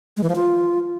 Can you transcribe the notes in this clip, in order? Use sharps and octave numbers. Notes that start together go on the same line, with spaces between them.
G#3
E3
F3
F4